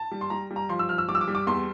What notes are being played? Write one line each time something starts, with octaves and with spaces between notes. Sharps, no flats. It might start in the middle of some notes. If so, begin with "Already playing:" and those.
Already playing: A5
G3
C6
G3 A#5
G3
A#5
F3 C6
E6
F3 F6
E6
G3 D6
E6
D6
G3
D6
E2 C6